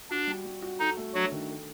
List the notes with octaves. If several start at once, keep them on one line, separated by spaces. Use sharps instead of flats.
D4 F#4
G3
G3
F#4
D#4 A4
A3
F#3 D4 F#4
D#3
A4